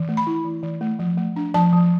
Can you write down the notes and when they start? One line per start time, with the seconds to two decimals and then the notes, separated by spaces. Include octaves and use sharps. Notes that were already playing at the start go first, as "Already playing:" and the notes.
Already playing: E3
0.09 A3
0.17 B5
0.27 E4
0.45 E3
0.63 E3
0.81 A3
0.99 F3
1.17 A3
1.36 D4
1.54 F3 A5
1.73 F3